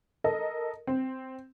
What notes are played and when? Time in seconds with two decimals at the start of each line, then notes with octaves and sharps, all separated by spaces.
0.24 A4 A#4 D#5
0.87 C4